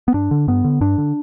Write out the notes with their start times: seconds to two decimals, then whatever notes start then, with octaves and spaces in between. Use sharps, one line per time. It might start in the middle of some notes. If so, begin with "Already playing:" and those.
0.08 B3
0.14 G2 D4
0.31 D3
0.48 G2 B3
0.64 D3
0.81 G2 D4
0.98 D3